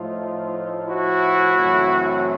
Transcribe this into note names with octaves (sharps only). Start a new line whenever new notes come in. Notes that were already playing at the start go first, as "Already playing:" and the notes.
Already playing: A2 F3 A3 D#4 F4
E4 F#4
F#2 C#3 E3 A3 C4